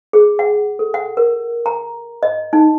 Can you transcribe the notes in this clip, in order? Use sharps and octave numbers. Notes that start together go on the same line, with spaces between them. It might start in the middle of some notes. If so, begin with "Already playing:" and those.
G#4
F#5
A4
F#5
A#4
A#5
D#5
D#4